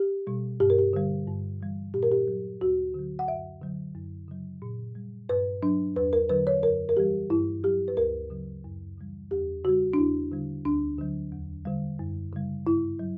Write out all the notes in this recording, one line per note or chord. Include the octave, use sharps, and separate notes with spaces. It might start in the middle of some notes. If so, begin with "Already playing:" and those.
Already playing: G4
B2 G3
G2 G4
A#4
G4
D3 G3
G2
E3 G3
A#2 G4
A#4
G4
F#3
D2 F#4
D3 F#3
F#5
F#2 E5
D3 F#3
F#2
C#3 F#3
A#2
G3
G2 B4
F#3 D4
E2 B4
A#4
D3 F#3 B4
C#5
F#2 A#4
A#4
E3 G3 G4
G2 E4
F#3 G4
B4
D2 A#4
C#3 F#3
F#2
C#3 E3 G3
E2 G4
C#3 G3 F#4
D4
E2 E4
D3 G3
D2 D4
D3 F#3
E2
D3 G3
F#2
C#3 G3
G2 E4
F#3